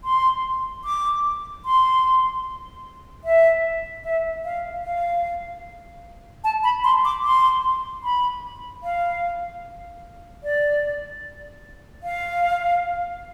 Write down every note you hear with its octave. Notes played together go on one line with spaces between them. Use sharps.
C6
D6
C6
E5
E5
F5
F5
A5
B5
C6
D6
C6
B5
F5
D5
F5